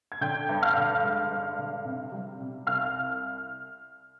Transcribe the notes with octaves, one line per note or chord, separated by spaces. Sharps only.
G#6
D3 G5 G6
G2
F5 F6
D3
G#3
G2
D3
C3
G3
C3
C2 F5 F6